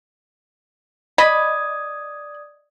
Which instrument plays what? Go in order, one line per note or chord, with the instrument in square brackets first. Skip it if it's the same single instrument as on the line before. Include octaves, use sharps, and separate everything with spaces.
[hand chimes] D5 D#6 G#6 [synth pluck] D#5 [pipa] B5